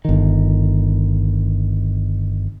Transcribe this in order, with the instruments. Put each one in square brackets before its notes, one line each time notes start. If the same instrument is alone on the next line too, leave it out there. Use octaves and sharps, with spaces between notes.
[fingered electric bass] G1 D#3